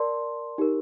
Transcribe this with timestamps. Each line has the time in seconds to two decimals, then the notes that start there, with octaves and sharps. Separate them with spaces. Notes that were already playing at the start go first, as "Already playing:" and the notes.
Already playing: A#4 D5 A5 C6
0.58 D#4 G4 A#4